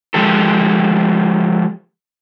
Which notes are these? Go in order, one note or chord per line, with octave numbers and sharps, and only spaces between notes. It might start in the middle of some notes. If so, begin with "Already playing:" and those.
F3 G#3 G4 A4